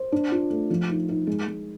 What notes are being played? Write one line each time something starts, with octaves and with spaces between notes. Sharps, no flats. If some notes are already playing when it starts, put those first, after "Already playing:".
Already playing: C5
D4
F4
A3
F3
D#4
D#4
G#3
G#3